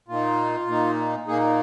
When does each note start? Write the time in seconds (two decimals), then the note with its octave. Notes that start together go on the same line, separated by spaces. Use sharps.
0.08 A#2 A#3 D#4 F4
0.68 A#2 A#3 D#4
1.27 A#2 A#3 D#4 G#4